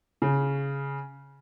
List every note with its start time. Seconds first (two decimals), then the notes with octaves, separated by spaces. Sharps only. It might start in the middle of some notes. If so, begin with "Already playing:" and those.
0.22 C#3